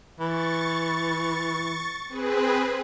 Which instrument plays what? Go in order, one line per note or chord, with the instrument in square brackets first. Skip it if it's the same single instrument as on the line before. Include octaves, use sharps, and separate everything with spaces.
[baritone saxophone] E3 [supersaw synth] C#6 A6
[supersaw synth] C4 G#4 B4